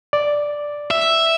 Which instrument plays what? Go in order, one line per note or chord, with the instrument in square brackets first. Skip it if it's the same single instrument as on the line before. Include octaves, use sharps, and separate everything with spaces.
[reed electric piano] D5
[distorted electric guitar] E5